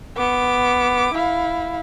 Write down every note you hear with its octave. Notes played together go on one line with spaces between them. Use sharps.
B3 D6
E4 F5